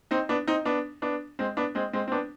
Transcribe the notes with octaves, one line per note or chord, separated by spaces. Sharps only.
C4 D#4
B3 D4
C4 D#4
B3 D4
B3 D4
G#3 C4
B3 D4
G#3 C4
G#3 C4
C4
B3 D4